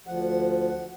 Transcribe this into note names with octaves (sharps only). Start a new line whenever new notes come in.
D2 F3 F#5